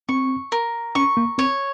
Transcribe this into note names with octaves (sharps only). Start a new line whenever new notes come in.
C4 C#6
A#4
C#4 C#6
A#3
C4 C#5